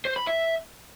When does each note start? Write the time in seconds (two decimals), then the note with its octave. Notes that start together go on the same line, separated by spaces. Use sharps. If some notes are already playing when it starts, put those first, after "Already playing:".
0.05 C5
0.16 B5
0.27 E5